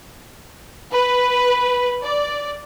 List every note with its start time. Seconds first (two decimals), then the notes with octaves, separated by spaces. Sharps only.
0.92 B4
2.04 D5